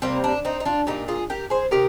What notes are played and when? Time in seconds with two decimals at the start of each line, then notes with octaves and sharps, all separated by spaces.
0.02 C3 G3 A#3 C4
0.24 D4
0.45 C4 D#4
0.60 D#4
0.65 D4 F4
0.87 A#2 G3 A#3 D#4 G4
1.08 F4 G#4
1.30 G4 A#4
1.50 G#4 C5
1.71 C3 D#3 G4 A#4